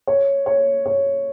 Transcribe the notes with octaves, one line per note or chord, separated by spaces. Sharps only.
C#5
C#5
C#5